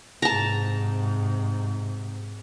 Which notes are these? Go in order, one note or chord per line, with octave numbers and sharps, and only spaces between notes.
G#2 C3 A5 A#5